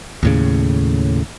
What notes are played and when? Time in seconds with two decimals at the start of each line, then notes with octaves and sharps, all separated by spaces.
0.23 D#2 A2 C#3